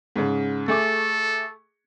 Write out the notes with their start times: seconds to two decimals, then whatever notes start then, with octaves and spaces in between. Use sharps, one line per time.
0.16 G#2 C#3
0.68 A3 G#4 A4 D6